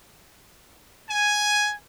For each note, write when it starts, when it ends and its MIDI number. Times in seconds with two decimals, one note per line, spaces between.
1.10 1.74 80